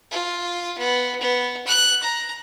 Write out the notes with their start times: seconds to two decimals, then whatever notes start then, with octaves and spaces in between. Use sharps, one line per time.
0.11 F4
0.78 B3
1.21 B3
1.67 F#6
2.03 A#5